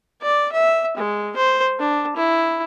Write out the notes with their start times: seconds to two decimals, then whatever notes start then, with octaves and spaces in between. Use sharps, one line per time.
0.22 D5
0.52 E5
0.97 G#3
1.37 C5
1.80 D4
2.16 E4